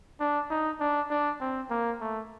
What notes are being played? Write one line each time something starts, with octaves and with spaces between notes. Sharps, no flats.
D4
D#4
D4
D4
C4
A#3
A3